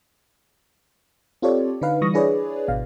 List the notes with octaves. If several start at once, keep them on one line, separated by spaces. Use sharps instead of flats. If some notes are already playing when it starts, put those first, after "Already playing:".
C4 F4 G4 A4 C#5 D5
D3 D#4 B4 F5
E3 G3 C#6 D#6 A#6
D4 E4 G#4 B4 C#5 D5
G#1 B2 F5